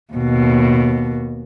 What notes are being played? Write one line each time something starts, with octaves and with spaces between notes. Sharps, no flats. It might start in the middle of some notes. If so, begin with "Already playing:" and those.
D#2 B2